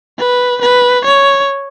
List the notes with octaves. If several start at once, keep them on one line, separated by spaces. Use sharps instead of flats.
B4
B4
C#5